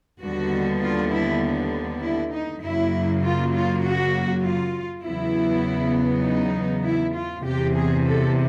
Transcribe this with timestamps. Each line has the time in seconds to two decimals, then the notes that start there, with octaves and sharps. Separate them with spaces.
0.20 D#2 D3 G3 B3 F#4
0.81 F4
1.11 E4
2.01 E4
2.32 D#4
2.61 F#2 C#3 F#3 A#3 E4
3.22 F4
3.53 F4
3.82 F#4
4.43 F4
5.03 E2 C#3 F#3 B3 E4
6.24 D#4
6.83 E4
7.15 F4
7.44 E2 C3 E3 G4
7.75 G#4
8.05 A4